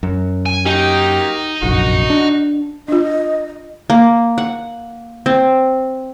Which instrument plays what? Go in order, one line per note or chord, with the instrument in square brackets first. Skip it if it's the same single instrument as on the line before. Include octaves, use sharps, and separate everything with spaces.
[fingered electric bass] F#2
[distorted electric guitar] G#5
[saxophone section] A#3 F#4 G4 [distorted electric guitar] D#4
[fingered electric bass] F1 A#1 F#2 [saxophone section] F#4
[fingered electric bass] D4
[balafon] D4 F4 [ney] D#5
[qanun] A#3
F#5
C4